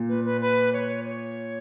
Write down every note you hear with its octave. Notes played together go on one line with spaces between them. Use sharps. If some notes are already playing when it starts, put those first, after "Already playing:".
Already playing: A#2
B4
B4
B4
C#5
C#5